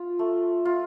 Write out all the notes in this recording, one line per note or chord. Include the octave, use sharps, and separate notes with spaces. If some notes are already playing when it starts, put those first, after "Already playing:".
Already playing: F4
A3
F4